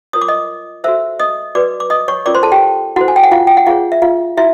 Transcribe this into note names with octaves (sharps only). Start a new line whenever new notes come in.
F4 A#4 C#5 D#6
D6
D#5 D#6
F#4 A4 C5 E5 E6
D#5 D#6
F#4 B4 D5 D6
D6
D#5 D#6
C#5 C#6
C#4 F4 A#4 C#5 D5 D6
C5 C6
A4 A5
G4 G5
E4 F#4 A4 C5 F#5
G#5
G5
F#5
F4 F5
G5
F#5
F4 G#4 C#5 F5
E5
F4 F5
E4 F#4 E5